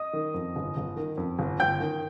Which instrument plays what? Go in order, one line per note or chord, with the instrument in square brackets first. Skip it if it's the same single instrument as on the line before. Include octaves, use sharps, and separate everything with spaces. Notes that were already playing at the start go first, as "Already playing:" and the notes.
Already playing: [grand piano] D#5 D#6
D#3
F2
G1
G1
D#3
F2
G1
G1 G5 G6
D#3